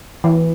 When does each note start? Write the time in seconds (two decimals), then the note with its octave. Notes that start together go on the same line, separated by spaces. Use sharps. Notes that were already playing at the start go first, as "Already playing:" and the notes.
0.24 E3